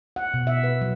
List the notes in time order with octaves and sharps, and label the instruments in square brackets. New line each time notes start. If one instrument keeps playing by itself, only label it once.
[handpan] F#5
B2
E5
B4
F#3